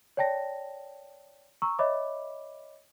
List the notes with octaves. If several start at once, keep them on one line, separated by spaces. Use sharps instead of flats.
C#5 D5 G5 A5 A#6
A#5 C#6 E6
C#5 D#5 E5 B5 D6